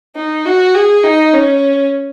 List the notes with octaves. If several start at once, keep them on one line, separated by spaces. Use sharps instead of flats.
D#4
F#4
G#4
D#4
C#4